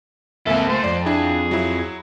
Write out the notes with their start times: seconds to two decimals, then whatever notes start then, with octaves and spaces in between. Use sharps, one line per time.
0.47 C#2 A#3 C4 A4 E5 G#5
0.69 A3 C5
0.84 F2 D5
1.06 D4 E4 G#4
1.51 F#3 E4